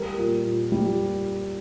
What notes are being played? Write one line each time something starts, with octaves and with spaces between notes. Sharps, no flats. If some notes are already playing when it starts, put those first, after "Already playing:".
Already playing: G3 A#4
A#2
A#2
G3